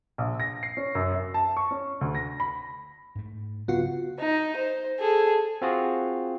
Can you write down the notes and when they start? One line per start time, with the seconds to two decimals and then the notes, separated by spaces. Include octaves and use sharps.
0.18 A#1
0.40 A#6
0.63 C7
0.77 C#4
0.95 F#2
1.14 E5
1.34 A5
1.57 C#6
1.71 C#4
2.01 D2
2.15 A#6
2.40 B5
3.15 G#2 A3
3.68 C#3 F#3 B3 C4 F4 F#4
4.19 D#4
4.56 C5
4.99 G#4 A4
5.62 C4 F4 F#4 G#4